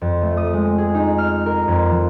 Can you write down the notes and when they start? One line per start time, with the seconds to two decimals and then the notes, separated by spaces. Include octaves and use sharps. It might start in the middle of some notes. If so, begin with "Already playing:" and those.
0.01 F2
0.22 A3
0.37 D#6
0.53 G#3
0.78 G#4
0.95 D#4
1.18 F6
1.46 A#4
1.68 F2
1.91 F3